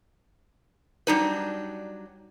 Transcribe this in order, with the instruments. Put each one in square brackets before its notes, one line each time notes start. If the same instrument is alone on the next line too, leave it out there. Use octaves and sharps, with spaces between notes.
[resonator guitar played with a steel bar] F#3 G3 D4 D#4 B4